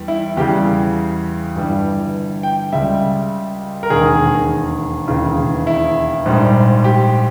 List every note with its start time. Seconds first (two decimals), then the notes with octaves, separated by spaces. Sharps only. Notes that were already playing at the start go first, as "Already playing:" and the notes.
Already playing: E2 G3
0.08 E4
0.37 E2 C#3 E3 G3 G4
1.55 G1 G2 E3 G3
2.43 G5
2.73 C#2 C#3 G3 E5
3.83 A#4
3.90 E1 D#2 D#3 G#4
5.08 E1 D#2 C#3 E3
5.67 E4
6.25 A#1 G#2 G3
6.84 G4